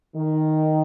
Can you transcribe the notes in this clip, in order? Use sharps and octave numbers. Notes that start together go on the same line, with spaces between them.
D#3